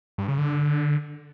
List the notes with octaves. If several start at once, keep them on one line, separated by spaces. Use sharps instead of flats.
G2
C#3
D3